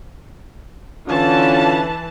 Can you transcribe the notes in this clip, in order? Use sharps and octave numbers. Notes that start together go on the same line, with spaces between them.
D3 E3 C#4 F4 A5